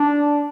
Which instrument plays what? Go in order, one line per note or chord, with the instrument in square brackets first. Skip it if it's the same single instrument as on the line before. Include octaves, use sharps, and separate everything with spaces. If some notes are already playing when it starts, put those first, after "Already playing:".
Already playing: [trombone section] D4